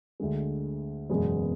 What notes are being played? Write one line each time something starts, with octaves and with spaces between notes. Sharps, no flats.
D2 D3 G#3
F#1 E2 B2 G#3